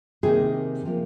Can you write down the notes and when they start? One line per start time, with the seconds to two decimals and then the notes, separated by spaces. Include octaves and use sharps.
0.23 C3 D#3 A#3 G#4
0.85 C3 F3 A#3